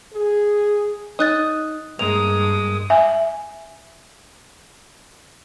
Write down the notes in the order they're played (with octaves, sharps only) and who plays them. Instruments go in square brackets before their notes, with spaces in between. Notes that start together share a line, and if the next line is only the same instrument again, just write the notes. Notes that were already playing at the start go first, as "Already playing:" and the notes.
[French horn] G#4
[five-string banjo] D#4 [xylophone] D#6 F#6 A6
[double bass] G2 [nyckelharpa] G#3 D#6 [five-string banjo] A#3 [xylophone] F7
[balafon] E5 G#5